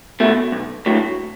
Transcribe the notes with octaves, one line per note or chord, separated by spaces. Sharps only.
B2 A3
B1
A2 F#3